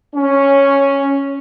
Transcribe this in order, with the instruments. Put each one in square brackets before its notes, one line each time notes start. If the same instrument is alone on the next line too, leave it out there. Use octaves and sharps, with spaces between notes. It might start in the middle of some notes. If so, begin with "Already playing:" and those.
[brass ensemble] C#4